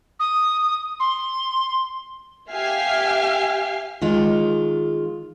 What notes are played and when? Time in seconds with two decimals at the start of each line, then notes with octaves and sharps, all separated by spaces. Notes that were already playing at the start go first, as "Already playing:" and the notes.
0.20 D#6
1.00 C6
2.51 G4 E5 F5 G#5 F6 C7
4.02 D#3 G#3 F4